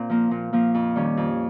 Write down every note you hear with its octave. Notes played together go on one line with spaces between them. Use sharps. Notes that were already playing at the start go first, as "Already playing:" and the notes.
Already playing: A#2 C4
F3 A#3
A#2
F3 A#3
F2
D#3 G3 C#4
F2